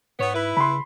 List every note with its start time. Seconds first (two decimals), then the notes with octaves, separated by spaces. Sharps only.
0.20 G#2 B3 C#5
0.34 E4 B4
0.57 C#3 B5 C6